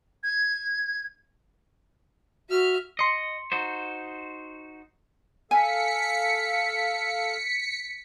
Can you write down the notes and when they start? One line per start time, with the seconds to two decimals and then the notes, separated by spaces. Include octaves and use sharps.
0.23 G#6
2.50 F#4 E5 F6
2.99 D#5 C6 C#7
3.52 D#4 F#4 C5
5.51 A4 F5 G#5 B6 C#7